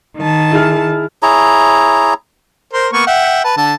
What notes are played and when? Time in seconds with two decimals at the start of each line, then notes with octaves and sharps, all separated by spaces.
0.18 D#3 A5
0.51 E4 G#4 F6
1.22 E4 G#4 C#5 A#5
2.73 A#4 C5 C6
2.93 A#3 B3 C#6
3.07 E5 F#5 G5
3.44 B4 A5
3.57 D3 A5